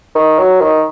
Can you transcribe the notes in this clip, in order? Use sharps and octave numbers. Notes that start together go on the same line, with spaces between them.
D#3
F#3
D#3